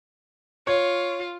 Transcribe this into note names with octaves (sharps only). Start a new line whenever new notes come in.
F4 C#5